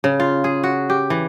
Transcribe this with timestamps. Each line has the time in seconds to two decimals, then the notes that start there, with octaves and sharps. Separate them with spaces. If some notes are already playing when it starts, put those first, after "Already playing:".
0.04 C#3
0.20 F4
0.44 G#4
0.63 F#4
0.90 G4
1.10 E3